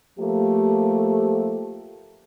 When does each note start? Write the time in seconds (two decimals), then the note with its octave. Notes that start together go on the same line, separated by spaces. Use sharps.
0.18 F3 A3 A#3 G4